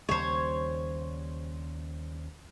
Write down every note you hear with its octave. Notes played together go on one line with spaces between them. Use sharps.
D#2 C#3 G3 C5 C#5